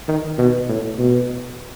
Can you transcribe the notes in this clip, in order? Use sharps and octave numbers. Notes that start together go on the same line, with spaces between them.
D#3
B2
A2
B2